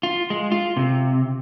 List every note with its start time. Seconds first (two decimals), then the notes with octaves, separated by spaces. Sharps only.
0.03 F4
0.30 G#3
0.52 F4
0.77 C3